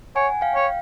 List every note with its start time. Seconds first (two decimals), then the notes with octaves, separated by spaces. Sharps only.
0.15 C#5 F#5 G#5
0.41 F5 G5
0.55 C#5